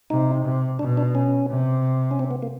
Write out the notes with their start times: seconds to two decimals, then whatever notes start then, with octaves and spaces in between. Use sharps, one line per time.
0.10 C3 D#4
0.45 C3
0.79 B2 D4
0.97 D4
1.15 C#4
1.50 C3
2.11 C#4
2.19 C4
2.31 B3
2.42 A#3